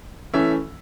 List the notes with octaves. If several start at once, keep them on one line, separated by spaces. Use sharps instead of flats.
E3 A3 C#4 E5